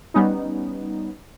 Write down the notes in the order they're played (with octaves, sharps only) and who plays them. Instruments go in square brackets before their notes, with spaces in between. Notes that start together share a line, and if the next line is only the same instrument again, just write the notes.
[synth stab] G3 B3 C#4 D#4